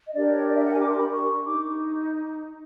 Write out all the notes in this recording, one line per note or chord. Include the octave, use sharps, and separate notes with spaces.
D#5
D4 G4 A#4 D5
C#5
D5
E5
F#5
G#5
D6
C6
B5
C#6
D#4 D6